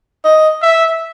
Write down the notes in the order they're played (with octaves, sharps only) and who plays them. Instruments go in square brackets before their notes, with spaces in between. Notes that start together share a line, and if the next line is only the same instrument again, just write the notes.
[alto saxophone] D#5
[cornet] E5